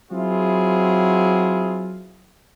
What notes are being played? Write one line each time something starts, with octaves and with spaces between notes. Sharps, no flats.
F#3 C4 E4 F4 G#4